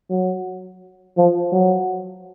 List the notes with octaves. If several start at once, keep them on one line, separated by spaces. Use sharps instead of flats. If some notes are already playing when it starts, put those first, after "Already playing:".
F#3
F3
F#3